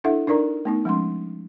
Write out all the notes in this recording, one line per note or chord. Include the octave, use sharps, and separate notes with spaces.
D4 E4 A4 E5 F#5
D4 D#4 A#4 D5 A#5
A3 B3 D#4
F3 G#3 C#4 C6